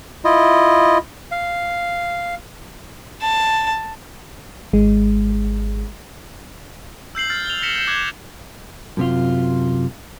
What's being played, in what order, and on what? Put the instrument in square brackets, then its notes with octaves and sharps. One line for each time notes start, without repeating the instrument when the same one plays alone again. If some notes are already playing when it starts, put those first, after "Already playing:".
[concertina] E4 F4 D#5
F5
[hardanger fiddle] A5
[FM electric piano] G#1 G#3
[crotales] E6 G6 C7 F#7
F6 A6
F7 G7
F6 A#6 B6 C#7 E7 G7
G6 E7
D6 F#6 G#6
[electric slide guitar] F#2 C3 F4